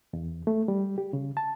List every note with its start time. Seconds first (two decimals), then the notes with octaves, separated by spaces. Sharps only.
0.13 E2
0.47 A3
0.68 G3
0.98 G4
1.13 C#3
1.37 A5